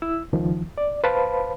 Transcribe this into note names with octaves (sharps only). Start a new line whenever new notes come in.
E4 E6
C#2 D#3 F3
D5
B4 C5 F5 A5 B5